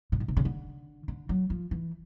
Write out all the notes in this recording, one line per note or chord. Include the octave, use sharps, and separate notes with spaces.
A#2
B2
C3
C#3
D3
D3
F#3
F3
E3